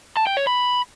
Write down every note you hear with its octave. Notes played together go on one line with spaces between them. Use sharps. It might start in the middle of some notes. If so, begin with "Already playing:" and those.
A5
G5
C#5
B5